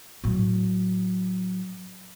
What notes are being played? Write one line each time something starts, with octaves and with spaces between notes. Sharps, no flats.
A2 F#3